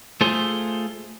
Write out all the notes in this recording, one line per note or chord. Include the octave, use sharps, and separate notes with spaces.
A3 F4 G#4 C5